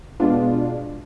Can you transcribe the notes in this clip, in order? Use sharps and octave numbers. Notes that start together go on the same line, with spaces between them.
B2 G#3 B3 D4 F4